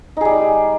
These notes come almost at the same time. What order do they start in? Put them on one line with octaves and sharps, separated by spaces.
D#4 G#4 G3